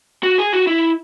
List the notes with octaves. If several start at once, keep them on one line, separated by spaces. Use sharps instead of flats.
F#4
G#4
F#4
E4